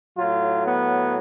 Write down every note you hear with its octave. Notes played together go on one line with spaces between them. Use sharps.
A2 F#3 F4
B3